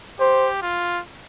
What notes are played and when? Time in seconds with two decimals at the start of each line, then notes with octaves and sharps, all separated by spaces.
0.20 G4 C5
0.62 F4